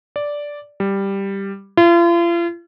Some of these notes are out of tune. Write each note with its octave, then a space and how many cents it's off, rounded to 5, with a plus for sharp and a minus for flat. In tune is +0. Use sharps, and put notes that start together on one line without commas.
D5 -5
G3 +5
F4 -40